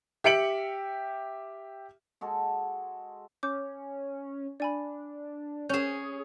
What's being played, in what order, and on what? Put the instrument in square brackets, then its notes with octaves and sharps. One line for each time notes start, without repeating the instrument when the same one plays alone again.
[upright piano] G4 E5 C#7 D7 F#7
[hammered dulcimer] G#3 F#4 A4
[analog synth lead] C#4 [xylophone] D6 G6
[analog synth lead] D4 [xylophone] D5 G#5 B5
[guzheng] C#4 G#4 [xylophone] G6 E7